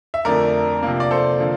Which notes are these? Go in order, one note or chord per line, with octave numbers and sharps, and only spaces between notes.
E5
F2 D3 A3 A#4 D5
C3 F3 A#3
D5
A4 C5
D3 F3 A#3